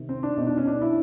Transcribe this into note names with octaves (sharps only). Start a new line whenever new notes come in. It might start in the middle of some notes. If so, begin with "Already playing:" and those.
Already playing: C3 D#3
C4
D4
B2 D#4
D4
C#4
D4
E4